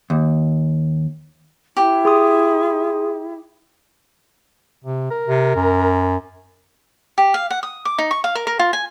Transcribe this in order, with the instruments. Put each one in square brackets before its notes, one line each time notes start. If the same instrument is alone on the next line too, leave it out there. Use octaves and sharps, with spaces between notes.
[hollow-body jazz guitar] D#2
[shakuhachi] E4 [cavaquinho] G4
[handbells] G#4 C6 D#6
[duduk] C3
A#4
[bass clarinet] C3
F#2
[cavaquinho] G4
F5
F#5
D#6
D6
D#4
C#6
F5
A#4
A#4
F4
G#5